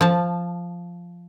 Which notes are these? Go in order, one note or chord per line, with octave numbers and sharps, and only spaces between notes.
F3 A5